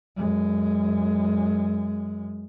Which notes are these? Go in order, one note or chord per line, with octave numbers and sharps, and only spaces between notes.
F#2 G#3